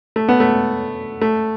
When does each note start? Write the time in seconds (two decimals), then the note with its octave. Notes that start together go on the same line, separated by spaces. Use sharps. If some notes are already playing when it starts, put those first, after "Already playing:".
0.16 A3
0.29 B3
0.40 A3
1.21 A3